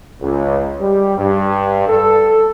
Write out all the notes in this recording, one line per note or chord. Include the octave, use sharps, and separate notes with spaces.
C#2
G3
G2
A4